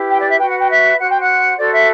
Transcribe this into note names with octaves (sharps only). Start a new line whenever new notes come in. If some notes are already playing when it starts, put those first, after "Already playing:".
Already playing: E4 G4 B4
G5
D5
E5
F#4 B4 G5
F#5
G5
E5
F#4 C5 F#5
G5
F#5
F#4 A4 C5 D5
E5